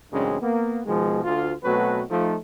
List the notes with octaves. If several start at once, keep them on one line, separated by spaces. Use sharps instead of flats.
A1 F#2 C#3 G#3 C4 D4
A#3 B3
B2 D#3 F3 G#3
D2 F4
B2 F#3 A3 C4 F#4 B4
F3 A3 D#4